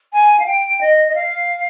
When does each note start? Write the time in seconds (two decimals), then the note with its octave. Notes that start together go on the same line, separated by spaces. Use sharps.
0.13 G#5
0.40 F5
0.47 G5
0.81 D#5
1.08 D#5
1.15 F5